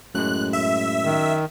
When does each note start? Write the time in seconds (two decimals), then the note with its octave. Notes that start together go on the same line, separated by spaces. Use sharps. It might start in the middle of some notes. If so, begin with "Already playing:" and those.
0.15 F#2 A2 G#3 F#6
0.53 E5
1.05 D#3